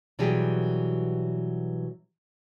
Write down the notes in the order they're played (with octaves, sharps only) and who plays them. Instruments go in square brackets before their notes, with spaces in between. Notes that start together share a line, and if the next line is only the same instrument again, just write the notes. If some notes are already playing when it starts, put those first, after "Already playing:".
[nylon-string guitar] B2 E3 F#3 G3 G4 G#4